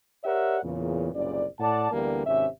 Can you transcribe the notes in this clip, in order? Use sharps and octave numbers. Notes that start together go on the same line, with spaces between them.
G4 A#4 C#5 D5 E5 F#5
E2 A#2 C#3
F#1 C2 A#2 C#3 D5
A2 D5 F#5 A5
D2 D3 E3 G3 A#3 B3
G#1 C3 C#4 E5